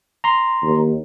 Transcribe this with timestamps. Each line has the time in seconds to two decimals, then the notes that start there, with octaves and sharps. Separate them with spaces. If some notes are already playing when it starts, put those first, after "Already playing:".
0.24 A#5 C6
0.63 D#2